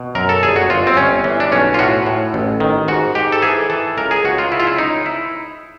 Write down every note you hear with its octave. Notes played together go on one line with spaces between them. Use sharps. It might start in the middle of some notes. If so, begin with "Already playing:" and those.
Already playing: B2
F#2 A#4
A4
G1 G#4
F#4
G1 F4
C4
G1 C#4
E3
D4
B1 C#4
F4
A2 F#4
A2
A1
D#3
G#2 F#4
G#2 G4
A4
E3 G#4
E3 A4
C#2 A#4
G#4
C#2 F#4
F4
C#3 E4
F4
E4
C#2 D#4
E4